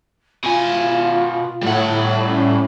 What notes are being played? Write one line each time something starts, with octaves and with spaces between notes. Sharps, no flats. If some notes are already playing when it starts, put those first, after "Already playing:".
B2 F4 G#5
A2 G3 F#5
C#4